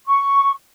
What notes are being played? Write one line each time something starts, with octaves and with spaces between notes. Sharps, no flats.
C#6